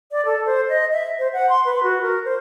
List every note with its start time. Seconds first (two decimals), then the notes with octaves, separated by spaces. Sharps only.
0.12 D5
0.26 A4
0.46 C5
0.69 D#5
0.93 E5
1.19 C5
1.33 F#5
1.49 C6
1.65 B4
1.83 F#4
2.02 A#4
2.25 C5